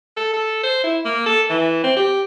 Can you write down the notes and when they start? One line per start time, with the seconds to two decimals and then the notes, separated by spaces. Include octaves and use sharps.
0.17 A4
0.33 A4
0.64 C5
0.84 E4
1.05 A#3
1.26 A4
1.50 E3
1.84 C4
1.96 G4